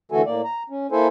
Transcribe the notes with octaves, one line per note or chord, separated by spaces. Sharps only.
D3 E3 A3 F#4 A4 G#5
A2 A#3 D5
A#5
C#4
A#3 E4 A4 C5 G#5